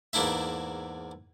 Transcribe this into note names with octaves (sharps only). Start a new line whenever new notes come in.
E2 G#2 A#3 D4 E4 E5